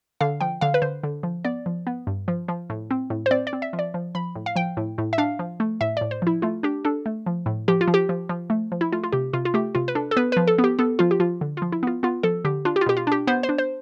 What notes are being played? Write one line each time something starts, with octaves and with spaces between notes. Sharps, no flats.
D3 F5
F3 G5
D3 F5
B4
D3 C5
D3
F3
B3 D5
F3
B3
G2
F3
F3
A2
C4
A2
C5
C4 D5
D5
C4
E5
F3
D5
F3
F3 B5
A2
F5
F3 G5
A2
A2
E5
D4 F5
F3
A3
A2 E5
A2 D5
C5
F3 E4
A3 F4
D4 G4
D4 A4
A3
F3
A2
F3 G4
F4
F3
G4
F3
F3
A3
F3
E4
A3 F4
F4
C3 G4
C3 F4
F4
A3 G4
C3 F4
B4
D4 A4
A4
B3 B4
F3 B4
A4
B3
G4
B3 A4
F3 F4
G4
F3 F4
D3
F3 F4
E4
B3 F4
B3 F4
F3 A4
D3 G4
D4 F4
G4
F4
B2 G4
F4
D4 G4
B3 C5
C5
D4
C5